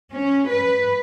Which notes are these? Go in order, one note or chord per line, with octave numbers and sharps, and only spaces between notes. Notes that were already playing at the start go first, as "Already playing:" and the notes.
C#4
B4